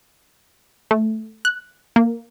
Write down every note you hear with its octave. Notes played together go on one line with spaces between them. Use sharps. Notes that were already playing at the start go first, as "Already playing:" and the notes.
A3
F#6
A#3